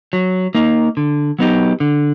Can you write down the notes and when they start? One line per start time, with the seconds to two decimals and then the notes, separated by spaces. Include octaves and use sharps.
0.13 F#3
0.55 A#3 D#4
0.97 D3
1.39 F#3 B3 D#4 G4
1.80 D3